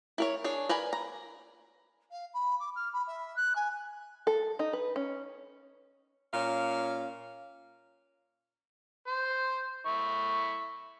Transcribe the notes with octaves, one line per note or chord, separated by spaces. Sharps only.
E4 A#4 C#5
D4 G#4 C#5
A#4 B4 D5 G#5
A#5
F5
B5
D6
F6
B5
E5
F#6
G#5
A4
D#4
B4
C#4
A#2 C#4 F5
C5
E4 C#6